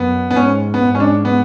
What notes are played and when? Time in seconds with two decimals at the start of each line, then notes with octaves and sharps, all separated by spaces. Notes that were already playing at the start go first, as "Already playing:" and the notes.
Already playing: F#2 B3
0.31 B3
0.35 G#2 C#4
0.74 B3
0.86 G#2
0.95 C#4
1.00 D4
1.25 B3